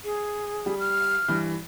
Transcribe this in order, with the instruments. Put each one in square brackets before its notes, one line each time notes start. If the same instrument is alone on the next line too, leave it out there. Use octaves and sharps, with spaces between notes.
[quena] G#4
[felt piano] G3
[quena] F6
[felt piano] G2 E3